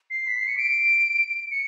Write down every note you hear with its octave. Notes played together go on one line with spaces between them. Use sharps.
C7
B6
C7
C#7
D7
C#7